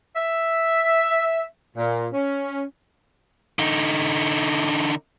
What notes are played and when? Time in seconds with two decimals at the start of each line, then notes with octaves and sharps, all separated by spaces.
0.15 E5
1.76 A#2
2.13 C#4
3.59 D3 D#4